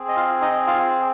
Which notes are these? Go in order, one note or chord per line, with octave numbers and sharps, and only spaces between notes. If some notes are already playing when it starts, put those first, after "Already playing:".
Already playing: C4 G#4
D#5
F4 F5
D#4 D#5
F4 F5